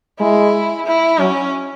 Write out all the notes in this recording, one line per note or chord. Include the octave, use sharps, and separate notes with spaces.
G#3 E4
E4
F#3 C#4